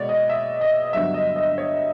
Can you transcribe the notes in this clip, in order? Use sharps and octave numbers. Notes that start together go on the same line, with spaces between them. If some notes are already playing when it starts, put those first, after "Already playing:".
Already playing: B2 G#3 B3 C#5 D5
D#5
E5
D#5
G2 D3 F#3 B3 E5
D#5
D#5
C#5